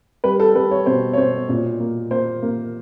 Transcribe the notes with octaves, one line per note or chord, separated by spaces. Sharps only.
G3 B4
A4
G3 B4
C#5
B2 C5
C#5
B2 C5
A#2
A#3
A#3 C5
A#3